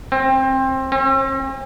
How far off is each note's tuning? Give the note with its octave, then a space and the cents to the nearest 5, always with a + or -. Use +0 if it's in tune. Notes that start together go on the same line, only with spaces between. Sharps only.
C4 +20
C4 +45